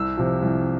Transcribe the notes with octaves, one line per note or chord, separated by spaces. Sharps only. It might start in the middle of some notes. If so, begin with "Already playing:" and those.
Already playing: C2 E6
C3 F3
C2